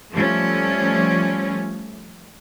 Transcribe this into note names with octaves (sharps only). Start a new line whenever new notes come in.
F3 G3 A3 C#4